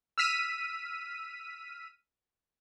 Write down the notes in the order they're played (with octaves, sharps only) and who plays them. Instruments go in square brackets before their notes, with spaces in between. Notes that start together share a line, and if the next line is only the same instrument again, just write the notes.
[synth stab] E6 F6 B6 D#7